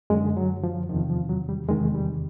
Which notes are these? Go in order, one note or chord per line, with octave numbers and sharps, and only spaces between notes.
F#2 D3 G#3
F#3
F3
E2 C3 D#3 F3
F3
F#3
G3
E2 C3 D#3 G#3
G3